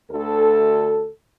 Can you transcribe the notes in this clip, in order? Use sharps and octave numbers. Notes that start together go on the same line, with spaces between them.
D2 A4